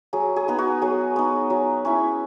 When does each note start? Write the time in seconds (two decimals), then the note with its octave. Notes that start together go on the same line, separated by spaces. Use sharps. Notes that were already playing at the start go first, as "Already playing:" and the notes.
0.13 F#3 G#4
0.36 G#4
0.48 B3 D#4
0.59 F#4
0.82 F#3 G#4
1.16 B3 D#4
1.50 F#3
1.85 C#4 E4